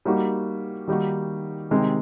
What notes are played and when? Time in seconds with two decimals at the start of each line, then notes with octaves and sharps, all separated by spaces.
0.05 G3 A#3 D#4 F#4
0.87 D#3 G3 A#3 D#4 F#4
1.71 C3 D#3 G#3